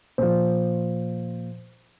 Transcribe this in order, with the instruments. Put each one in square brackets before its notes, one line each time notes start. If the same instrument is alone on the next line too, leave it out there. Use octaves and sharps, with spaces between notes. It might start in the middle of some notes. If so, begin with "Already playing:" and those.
[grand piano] A#2 F3 C5